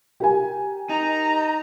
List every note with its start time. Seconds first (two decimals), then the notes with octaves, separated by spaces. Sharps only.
0.20 G4 A#4 G#5
0.89 D#4 A#5